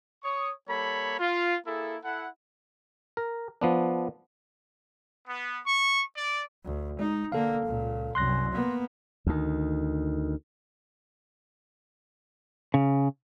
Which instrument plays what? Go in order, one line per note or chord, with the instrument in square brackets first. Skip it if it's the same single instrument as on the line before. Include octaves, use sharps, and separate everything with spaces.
[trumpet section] C#5 C#6 D#6
G3 A#3 A4 C#5 B5
F4
A#3 E4 G#4 A4
E4 A4 F#5
[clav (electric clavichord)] A#4
F3 B3 D4
[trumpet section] B3
C#6
D5
[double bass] D2
[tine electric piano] G#3 [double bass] D#4
[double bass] D3 A#3 [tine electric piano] A4 F5
[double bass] C#2 A#2
[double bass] C2 F#2 [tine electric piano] C6 F#6 A#6
[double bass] A#3 B3
[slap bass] D2 D#3
[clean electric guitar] C#3